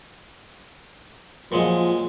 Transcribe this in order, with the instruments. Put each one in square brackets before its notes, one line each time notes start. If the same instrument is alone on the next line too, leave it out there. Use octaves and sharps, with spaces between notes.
[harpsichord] A#2 F#3 G#3 [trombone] F3